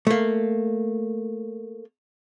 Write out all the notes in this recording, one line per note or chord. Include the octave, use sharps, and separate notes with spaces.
A3 A#3